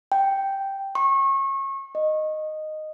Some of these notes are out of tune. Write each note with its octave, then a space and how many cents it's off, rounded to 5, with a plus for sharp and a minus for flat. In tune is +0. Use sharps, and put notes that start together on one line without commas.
G5 -5
C#6 -30
D#5 -10